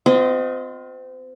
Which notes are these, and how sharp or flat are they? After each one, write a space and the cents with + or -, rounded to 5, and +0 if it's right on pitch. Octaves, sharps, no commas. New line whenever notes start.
C4 -30 F4 +30 D#5 +0